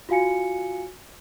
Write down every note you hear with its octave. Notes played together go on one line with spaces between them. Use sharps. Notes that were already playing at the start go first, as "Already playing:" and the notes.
F4 F#4 F5 G#5 C#7